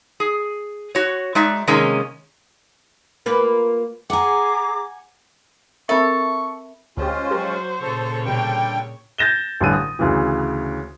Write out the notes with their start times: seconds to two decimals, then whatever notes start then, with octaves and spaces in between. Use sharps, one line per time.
0.20 G#4
0.95 F#4 C#5
1.35 G#3 D#4 D5 E5
1.67 C3 D#3 G#3 A#3 C#4
3.26 A#3 F4 B4
4.10 G#4 F#5 G#5 A#5 D6
5.89 C4 A4 A#4 E5 B5 C#6
6.97 D2 G#3 C#4 F4 G4 C5
7.31 F#3 F#4 G4 A#4
7.82 A#2 C#3 A4 C#5
8.26 B2 D3 G3 A#3 G5
9.18 G6 A6 A#6 E7 G7
9.60 A1 G2 D3 D#7
9.73 D#6
9.99 D2 C#3 E3